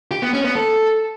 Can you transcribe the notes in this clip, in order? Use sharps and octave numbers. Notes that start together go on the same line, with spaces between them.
G4
B3
C#4
B3
A4